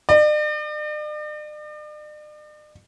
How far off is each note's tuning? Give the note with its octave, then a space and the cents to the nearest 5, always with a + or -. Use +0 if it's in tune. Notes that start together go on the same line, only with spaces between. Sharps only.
D5 +45